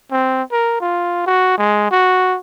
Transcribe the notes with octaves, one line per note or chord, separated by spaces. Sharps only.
C4
A#4
F4
F#4
G#3
F#4